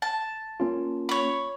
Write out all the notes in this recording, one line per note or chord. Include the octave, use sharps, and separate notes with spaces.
A5
A#3 C#4 F4
C#5 B5